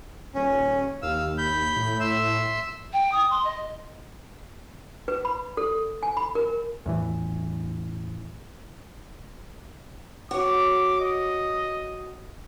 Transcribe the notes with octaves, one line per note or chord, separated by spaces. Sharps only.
D#1 C#4
D#2 F5 E6
B5 G6
A2
E5 C6 E6
G5
D#6
C6
D#5
B4
B5
A4
G#5
B5
A#4
E2 A2 E3
F#4 C#5 D6
D#5